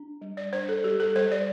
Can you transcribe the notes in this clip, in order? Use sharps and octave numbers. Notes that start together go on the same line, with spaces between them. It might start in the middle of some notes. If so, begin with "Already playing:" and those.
Already playing: D4
G3
D5
D4 C5
A4
G3 G4
A4
G3 C5
D5